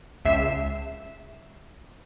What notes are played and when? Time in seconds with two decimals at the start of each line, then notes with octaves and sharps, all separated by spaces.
0.25 C#2 E5 C7 E7